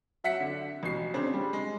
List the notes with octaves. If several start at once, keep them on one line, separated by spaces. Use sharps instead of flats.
F#3 E5 F#5 B6 C#7
D3
A1 B2 C7
C#3 C4 D4
G3
G#3